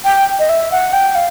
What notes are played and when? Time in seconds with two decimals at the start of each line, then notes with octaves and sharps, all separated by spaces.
0.05 G5
0.39 D#5
0.49 E5
0.72 F#5
0.93 G5
1.15 F5